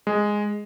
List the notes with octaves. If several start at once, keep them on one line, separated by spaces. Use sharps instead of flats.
G#3